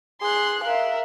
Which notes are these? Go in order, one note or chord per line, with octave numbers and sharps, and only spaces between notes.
G#4 C6 F#6
A#4 E5 F5